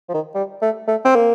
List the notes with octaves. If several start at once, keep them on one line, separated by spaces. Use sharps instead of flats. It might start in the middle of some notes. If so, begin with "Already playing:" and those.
F3
D#3
G3
A3
A3
C4
A#3